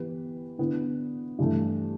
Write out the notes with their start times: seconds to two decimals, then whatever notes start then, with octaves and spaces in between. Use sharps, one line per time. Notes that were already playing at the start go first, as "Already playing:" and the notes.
Already playing: E3 B3 G4 B4
0.58 D3 B3 E4
1.39 G2 E3 A3